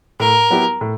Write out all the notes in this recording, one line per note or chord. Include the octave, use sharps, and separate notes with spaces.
A2 A#4
F#3 B3 E4 G4
A2